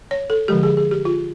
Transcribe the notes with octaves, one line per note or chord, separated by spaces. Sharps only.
C#5
A4
D3 F3 G#3 G4
G#4
G#4
G4
F4